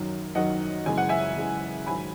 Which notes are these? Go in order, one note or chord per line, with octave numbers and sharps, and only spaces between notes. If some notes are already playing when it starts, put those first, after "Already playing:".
Already playing: F#2 D#3 F#3
F#2 D#3 F#3 D#5 F#5
F#2 C#3 E3 G#3 G#5
F#5
E5 G#5
F#2 C#3 E3 G#3
G#2 D#3 F#3 G#5 B5